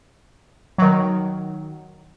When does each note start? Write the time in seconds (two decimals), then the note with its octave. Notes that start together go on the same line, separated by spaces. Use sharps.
0.78 D#3 F#3